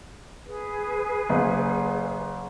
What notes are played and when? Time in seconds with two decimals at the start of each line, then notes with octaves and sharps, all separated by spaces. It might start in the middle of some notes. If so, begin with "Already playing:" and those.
0.45 G#4 B4
1.29 F#1